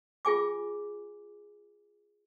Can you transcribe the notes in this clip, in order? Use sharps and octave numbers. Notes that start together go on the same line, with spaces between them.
F4 G#4 G#5 D6